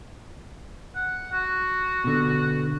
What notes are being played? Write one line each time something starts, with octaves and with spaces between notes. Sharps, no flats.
F#5
F#4
B2 D3